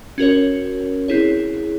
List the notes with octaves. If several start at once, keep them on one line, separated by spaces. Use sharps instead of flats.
C#4 F#4 A#4 C#5
C4 E4 G#4 C#5